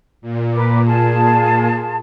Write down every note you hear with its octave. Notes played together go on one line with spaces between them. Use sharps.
A#2
A#4 B4 D6
F4 G#4 A5